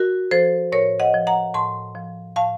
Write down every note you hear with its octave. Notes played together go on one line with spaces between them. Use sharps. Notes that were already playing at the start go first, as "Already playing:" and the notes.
Already playing: F#4 A#4
F3 A4 C5
A2 A#4 C#5
D#5 F#5
F3
F#5 A#5
A2 A5 C6
F3
A2 F5 A5